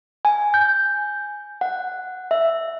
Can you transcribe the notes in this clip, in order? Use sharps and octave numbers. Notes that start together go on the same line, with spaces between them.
G#5
G6
F#5
E5